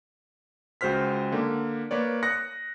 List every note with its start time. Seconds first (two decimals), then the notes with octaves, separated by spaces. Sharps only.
0.81 C#2 G#3 F#4 C5 F6 B6
1.32 D3 A#3
1.91 A#3 B4 C#5 D5
2.23 D#6 F#6 A#6 C#7